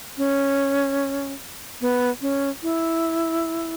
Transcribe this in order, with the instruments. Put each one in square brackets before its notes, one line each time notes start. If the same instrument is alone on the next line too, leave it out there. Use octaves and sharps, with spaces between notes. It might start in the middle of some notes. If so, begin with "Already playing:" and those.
[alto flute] C#4
B3
C#4
E4